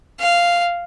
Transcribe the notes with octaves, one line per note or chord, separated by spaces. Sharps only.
F5